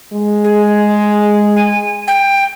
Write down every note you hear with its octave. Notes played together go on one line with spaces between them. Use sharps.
G#3
G#4
G#5
G5